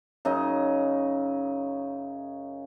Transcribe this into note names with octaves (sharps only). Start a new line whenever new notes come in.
F#2 C#3 D#4 D#5